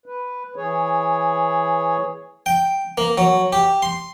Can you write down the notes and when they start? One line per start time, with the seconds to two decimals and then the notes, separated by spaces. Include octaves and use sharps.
0.06 B4
0.56 E3 G#4 C#5
2.46 G5
2.98 A#3
3.18 F#3
3.53 G4
3.82 C6